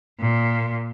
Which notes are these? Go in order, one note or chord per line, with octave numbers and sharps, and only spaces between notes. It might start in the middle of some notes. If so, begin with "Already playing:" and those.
A#2